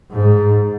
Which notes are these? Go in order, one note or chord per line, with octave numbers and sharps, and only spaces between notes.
G#2